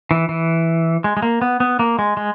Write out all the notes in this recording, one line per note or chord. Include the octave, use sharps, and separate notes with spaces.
E3
E3
G#3
G#3
A#3
B3
B3
A#3
G#3
G#3